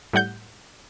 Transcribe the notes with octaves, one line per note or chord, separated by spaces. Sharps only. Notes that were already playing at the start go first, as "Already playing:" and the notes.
A2 G3 F#5 G6